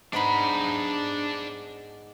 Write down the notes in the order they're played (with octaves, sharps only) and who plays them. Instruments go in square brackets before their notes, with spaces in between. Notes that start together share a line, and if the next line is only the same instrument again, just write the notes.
[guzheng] G#2 B3 D#4 [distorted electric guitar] D4 B5